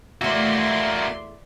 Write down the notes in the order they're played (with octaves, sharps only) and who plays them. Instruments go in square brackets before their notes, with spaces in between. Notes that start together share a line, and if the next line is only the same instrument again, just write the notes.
[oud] E2 A3 [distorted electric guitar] A#3 F#4 [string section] D5 C6 [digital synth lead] E5